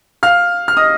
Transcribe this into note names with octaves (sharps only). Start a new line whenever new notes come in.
F5 F6
F6
D#5 D#6